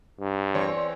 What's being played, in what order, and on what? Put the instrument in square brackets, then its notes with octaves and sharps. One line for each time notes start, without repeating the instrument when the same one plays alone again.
[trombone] G2
[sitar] E2 C4 C#5